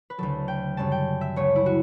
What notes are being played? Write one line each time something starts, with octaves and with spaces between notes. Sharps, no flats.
B4
D2 C#3 F#3 A4
G5
F#2 C#3 G3 C#4 A5
G5
E5
C#2 C#3 F#3 A3 C#5
E4
F#4